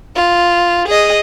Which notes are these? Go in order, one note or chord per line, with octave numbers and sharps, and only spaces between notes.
F4
G#4 D#5